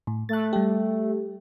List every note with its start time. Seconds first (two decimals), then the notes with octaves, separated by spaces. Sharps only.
0.07 A2
0.29 A3 F#6 A6
0.53 G3 G4